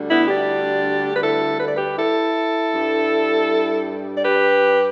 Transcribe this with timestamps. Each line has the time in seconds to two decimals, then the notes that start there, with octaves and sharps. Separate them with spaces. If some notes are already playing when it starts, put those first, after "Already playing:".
Already playing: D2 D3 G3
0.10 B3 E4
0.28 D4 G4
1.16 B4
1.22 E4 A4
1.60 B4
1.68 D5
1.77 G4 B4
1.98 E4 A4
2.73 G2 G3
4.18 D5
4.24 G4 B4